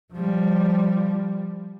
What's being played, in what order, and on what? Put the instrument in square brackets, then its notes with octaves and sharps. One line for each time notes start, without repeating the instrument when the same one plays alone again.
[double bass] F3 G3